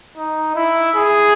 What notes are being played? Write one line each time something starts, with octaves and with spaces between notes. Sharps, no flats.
D#4
E4
G#4